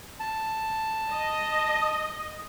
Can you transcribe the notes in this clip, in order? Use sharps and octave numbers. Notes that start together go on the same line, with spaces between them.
A5
D#5